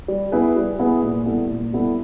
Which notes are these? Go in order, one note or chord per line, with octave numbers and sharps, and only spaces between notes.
G3
B3 E4 G#4 B4
G3
B3 E4 G#4 B4
A#2
G3 B3 E4 A4
A#2
G3 B3 E4 A4